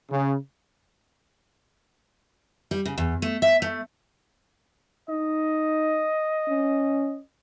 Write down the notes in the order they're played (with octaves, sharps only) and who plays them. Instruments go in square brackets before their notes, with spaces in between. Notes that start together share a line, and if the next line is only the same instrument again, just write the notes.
[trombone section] C#3
[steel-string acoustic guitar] G3
C#3
E2
A3
E5
A3
[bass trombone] D#4 [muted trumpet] D#5
[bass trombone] C#4